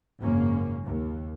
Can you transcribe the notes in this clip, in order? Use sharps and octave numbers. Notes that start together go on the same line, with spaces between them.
G#1 F#2 C#3 A#3 C#4
D#2